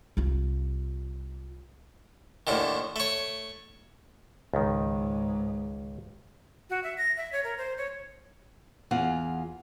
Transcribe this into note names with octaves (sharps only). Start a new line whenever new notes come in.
C2 F4
D#2 A2 D3 D#3
A3 C#5
C#2 G#2 D#3
F#4
E5
A#6
E5
C#5
A#4
C5
C#5
E2 F4 G#4 F#5